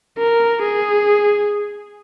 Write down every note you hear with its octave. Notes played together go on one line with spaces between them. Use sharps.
A#4
G#4